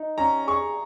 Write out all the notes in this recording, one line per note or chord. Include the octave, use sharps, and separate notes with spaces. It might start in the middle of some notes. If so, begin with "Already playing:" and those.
Already playing: D#4
C#4 A#5
G#4 C#6